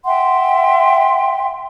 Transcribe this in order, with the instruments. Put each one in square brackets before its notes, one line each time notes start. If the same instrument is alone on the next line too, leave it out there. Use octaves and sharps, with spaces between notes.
[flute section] E5 F#5 G5 C6